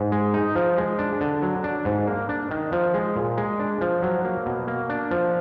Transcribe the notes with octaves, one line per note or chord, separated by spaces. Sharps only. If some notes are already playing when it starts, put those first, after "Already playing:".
Already playing: G#2
G#3
D#4
F3
G#3
D4
D3
F#3
D4
G#2
A#3
D4
D#3
F3
G#3
A#2
G#3
D4
F3
F#3
A#3
B2
A#3
D4
F3